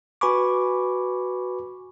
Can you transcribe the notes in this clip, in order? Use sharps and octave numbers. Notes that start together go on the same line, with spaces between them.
F#4 B4 G#5 B5 C#6 D6